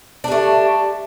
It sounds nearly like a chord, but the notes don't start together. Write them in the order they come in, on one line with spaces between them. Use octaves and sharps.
D4 G3 A3